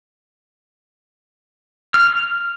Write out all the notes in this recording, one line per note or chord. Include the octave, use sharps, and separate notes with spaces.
F6